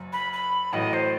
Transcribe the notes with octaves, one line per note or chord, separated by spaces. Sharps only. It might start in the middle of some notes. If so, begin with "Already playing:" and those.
Already playing: F#1 F#2
B5
B5
A1 A2 F#3 A3 D#5
C5